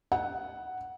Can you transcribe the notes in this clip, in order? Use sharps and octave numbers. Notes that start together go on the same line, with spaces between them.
F#5